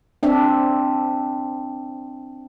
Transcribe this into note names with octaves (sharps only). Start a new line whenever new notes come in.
C4 D4 E5